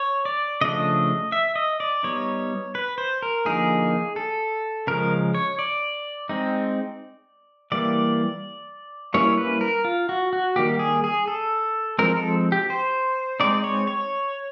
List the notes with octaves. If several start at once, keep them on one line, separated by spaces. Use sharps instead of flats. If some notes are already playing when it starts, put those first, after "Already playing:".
Already playing: C#5
D5
C#3 F3 A3 D4 D#5
E5
D#5
D5
G3 B3 D#4 C#5
B4
C5
A#4
D3 F3 A#3 D#4 G#4
A4
C#3 F3 G#3 A#4
C#5
D5
G#3 C4 D#4
E3 G3 A#3 D5
G3 A#3 C#4 E4 C#5
B4
A#4
F4
F#4
F#4
D#3 G3 A#3 G4
G#4
G#4
A4
F3 G#3 C4 A#4
A4
G4
C5
G#3 C4 D#4 D5
C#5
C#5